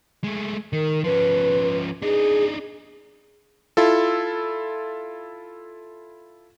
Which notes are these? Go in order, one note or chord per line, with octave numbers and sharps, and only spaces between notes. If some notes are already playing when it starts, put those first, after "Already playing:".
G#3 A3
D#3 A#4
F3 C#4 B4
D4 D#4 G#4
E4 F4 A4